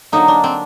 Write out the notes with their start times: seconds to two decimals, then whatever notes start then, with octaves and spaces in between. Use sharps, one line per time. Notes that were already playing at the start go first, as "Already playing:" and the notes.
0.12 D3 F#3 A#3 D#4
0.28 D4
0.44 C4